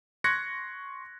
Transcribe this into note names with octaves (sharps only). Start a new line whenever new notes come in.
C6 C#6 F#6 G#6 A#6 C#7